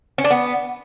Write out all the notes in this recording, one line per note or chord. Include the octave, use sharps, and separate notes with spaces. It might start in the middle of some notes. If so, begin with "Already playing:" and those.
C#4
D4
B3